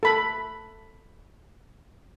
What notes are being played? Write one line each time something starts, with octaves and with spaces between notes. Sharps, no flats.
A4 B5